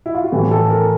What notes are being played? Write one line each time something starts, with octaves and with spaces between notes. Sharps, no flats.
E4
F4
F#4
A2 E3 G4
A4
A#4